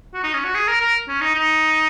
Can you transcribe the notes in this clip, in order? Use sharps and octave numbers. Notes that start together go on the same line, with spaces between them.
F#4
D#4
C#4
F#4
G#4
A#4
A#4
C#4
D#4
D#4